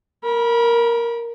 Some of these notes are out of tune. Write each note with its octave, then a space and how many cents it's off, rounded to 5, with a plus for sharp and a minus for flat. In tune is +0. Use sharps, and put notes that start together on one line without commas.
A#4 +0 B5 -30